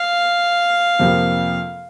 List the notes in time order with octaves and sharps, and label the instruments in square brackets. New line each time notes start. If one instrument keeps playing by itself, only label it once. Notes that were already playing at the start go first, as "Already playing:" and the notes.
Already playing: [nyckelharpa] F5
[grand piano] F2 C3 F3 A#3 F4